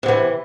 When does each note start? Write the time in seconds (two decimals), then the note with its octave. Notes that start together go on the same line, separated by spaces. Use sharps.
0.03 C3
0.06 F#3
0.08 E3